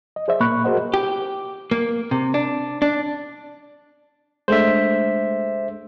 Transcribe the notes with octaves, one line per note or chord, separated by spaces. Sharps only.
D#5
G#4 C5 D5 E5
A#2 A#3 B5 C#6 F#6
F#4 G#4 A#4 C5 D#5 F#5
G4
A#3
C3
D4
D4
G#3 A3 D4 C5 E5